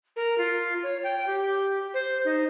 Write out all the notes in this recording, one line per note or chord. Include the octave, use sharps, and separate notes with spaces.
A#4
F4
C#5
G5
G4
C5
D#4